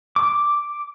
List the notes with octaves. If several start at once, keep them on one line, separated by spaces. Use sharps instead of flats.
D6